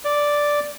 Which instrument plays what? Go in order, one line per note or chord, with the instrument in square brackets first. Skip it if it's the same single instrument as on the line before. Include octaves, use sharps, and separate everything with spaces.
[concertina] D5